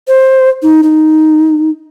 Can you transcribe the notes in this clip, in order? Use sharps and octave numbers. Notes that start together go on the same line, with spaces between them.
C5
D#4
D#4